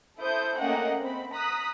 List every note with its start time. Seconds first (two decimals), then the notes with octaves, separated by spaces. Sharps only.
0.18 E4 A4 C5 D#6 G6
0.58 A3 A#3 C#4 D#5 F#5 G5
1.01 C4 B5
1.33 A#5 D#6 F#6 B6